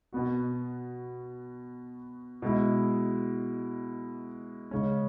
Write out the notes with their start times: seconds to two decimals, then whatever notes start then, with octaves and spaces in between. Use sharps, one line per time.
0.13 B2 B3 F#4
2.42 B2 G#3 E4
4.71 C#3 G#3 C#4